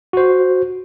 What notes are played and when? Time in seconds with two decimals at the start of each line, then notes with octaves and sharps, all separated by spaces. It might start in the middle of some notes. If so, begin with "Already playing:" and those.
0.13 F#4 C5